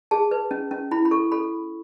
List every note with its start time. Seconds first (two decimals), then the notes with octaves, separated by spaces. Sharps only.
0.11 G#4 A5
0.31 B4
0.51 C#4
0.71 C#4
0.91 E4 B5
1.05 B5
1.11 A4 C#6
1.32 A4 B5